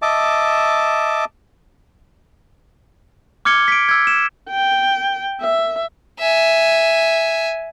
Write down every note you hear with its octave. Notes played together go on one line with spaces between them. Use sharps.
D#5 E5 A5 D6
D6 F6 G#6 C#7 G7
B6 D7
E6 G#6
E7
G5
E5
E5 G#5